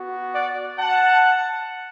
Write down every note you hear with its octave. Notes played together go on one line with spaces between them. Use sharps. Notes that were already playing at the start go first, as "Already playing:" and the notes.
Already playing: B3 F#4
D5 F#5
F#5 A5